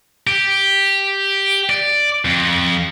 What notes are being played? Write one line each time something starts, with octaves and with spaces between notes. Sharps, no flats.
G4
D5
F2